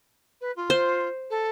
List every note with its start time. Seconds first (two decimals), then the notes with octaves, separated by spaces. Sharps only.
0.41 B4
0.56 F4
0.70 C5
1.30 A4